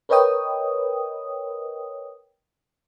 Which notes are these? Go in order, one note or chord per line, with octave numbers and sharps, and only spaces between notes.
A#4 B4 C#5 D#5 G5 D#6